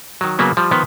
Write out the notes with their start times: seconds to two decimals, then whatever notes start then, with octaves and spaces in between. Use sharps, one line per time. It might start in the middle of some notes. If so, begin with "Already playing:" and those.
0.21 D#3 F#3
0.39 C#3 F#3 A#3 B3
0.57 F3 G3
0.71 D#3 F3 B3